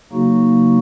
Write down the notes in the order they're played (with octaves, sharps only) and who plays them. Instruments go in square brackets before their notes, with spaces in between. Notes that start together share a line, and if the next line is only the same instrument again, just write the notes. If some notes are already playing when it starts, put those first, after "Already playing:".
[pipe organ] C#3 F#3 A#3 D#4 F#4